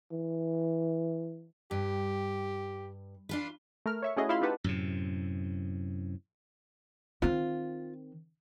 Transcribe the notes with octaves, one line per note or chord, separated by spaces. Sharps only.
E3
G2 G4
D4 F4 B4
A3 A#4 F6
C#5 E5 C#6
A3 C#4 E4 F#4 G#4 D#5
E4 F4 E5 F5 B5 C6
D#4 F4 G4 B4 F#5 A5
F#2 A2 C3
D#3 C4 F4